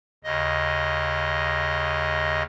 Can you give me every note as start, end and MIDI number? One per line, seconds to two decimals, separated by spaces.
0.24 2.43 39
0.24 2.43 49
0.24 2.43 75